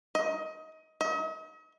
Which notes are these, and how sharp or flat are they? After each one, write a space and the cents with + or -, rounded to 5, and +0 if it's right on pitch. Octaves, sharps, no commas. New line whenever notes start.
D#5 +25
D#5 +45